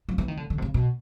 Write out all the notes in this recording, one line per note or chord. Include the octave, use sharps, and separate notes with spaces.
F3
E3
D#3
D3
D3
C3
C#3
B2